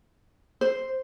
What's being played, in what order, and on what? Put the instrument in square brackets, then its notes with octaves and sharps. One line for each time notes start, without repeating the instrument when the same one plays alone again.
[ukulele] C5